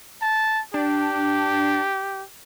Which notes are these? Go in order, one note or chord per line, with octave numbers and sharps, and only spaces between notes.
A5
D4 G4